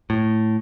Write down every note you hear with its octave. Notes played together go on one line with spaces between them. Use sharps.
A2